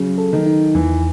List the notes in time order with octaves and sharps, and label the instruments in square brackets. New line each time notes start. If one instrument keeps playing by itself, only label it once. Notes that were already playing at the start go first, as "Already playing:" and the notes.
Already playing: [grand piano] C#3 [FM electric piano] F#3
[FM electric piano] A4
[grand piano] D#3
[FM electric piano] D#4
[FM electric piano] E2 [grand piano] E3